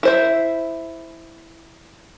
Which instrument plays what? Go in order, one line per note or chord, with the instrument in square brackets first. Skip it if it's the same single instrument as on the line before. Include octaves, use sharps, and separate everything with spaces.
[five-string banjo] E4 C5 E5